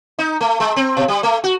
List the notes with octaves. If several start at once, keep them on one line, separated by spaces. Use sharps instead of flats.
D#4
A3
G#3
C4
B2
G3
A3
F#4